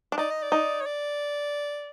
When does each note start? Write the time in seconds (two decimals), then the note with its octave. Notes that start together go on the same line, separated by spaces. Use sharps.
0.12 D4
0.18 D#4 D5
0.31 D#5
0.42 D5
0.52 D#4
0.81 C#5
0.86 D5